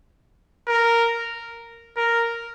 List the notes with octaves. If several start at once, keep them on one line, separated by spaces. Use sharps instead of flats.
A#4
A#4